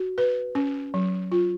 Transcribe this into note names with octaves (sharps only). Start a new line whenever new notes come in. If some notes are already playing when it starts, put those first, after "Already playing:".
Already playing: F#4
B4
C#4
F#3
F4